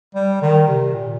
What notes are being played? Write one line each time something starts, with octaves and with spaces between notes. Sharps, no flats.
G3
D#3
C3
A#2